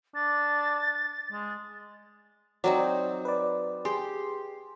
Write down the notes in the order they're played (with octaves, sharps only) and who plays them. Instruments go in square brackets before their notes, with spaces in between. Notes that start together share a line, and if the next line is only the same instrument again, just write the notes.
[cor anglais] D4 [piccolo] A6
[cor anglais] G#3
[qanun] F#3 C4 D#4 [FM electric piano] D5
[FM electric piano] B4 D5
[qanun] G4 [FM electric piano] G#4 C6